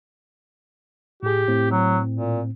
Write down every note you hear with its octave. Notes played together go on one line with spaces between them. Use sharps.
A2 G4 G#4
A2 C4
F#3
A#2